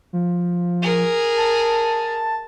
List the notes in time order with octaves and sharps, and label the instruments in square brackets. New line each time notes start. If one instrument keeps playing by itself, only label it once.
[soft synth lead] F3
[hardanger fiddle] G#4 A#4
[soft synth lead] A5